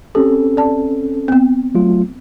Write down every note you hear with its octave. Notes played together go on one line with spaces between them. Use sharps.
C4 C#4 G4 A4
D5 A5
B3 C4
F#3 A3 F4